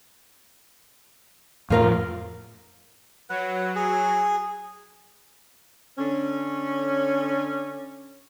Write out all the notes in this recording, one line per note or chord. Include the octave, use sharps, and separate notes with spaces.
F2 A2 F3 F4 A#4 F5
F#3 B4 F#5
G#4
D3 C#4